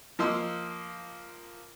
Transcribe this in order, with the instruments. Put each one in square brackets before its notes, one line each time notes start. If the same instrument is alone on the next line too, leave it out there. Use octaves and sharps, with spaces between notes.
[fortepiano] F3 A#3 D#5 C6 E6